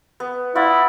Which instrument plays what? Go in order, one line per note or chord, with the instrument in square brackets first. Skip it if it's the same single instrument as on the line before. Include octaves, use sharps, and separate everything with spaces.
[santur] B3
[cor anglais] E4 [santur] F4 D5 F#5